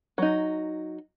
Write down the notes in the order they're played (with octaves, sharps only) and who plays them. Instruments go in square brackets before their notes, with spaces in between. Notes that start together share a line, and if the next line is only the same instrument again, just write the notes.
[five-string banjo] F#3 D#4